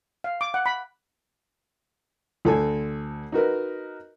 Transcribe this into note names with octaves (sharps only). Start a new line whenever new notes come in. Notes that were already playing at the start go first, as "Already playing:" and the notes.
F5
D6
F#5
B5
D2 A4 G#5
D#4 F#4 A#4 B4